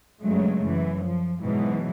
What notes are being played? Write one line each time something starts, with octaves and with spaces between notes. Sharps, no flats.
G2 C#3 F#3 G#3 A3
F#2 E3
F3
G#2 B2 E3 F#3